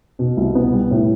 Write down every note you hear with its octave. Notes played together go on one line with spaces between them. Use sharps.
B2
C2
B3
G3
A2